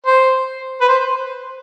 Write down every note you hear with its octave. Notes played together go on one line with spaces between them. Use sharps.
C5
B4
C5